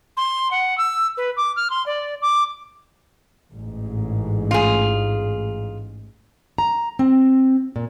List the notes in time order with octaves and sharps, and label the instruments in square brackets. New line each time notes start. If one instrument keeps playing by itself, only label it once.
[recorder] C6
F#5
E6
B4
D6
F6
C6
D5
D6
[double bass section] A1 G#2
[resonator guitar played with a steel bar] F4 G#4
[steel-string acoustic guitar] A#5
C4
A#2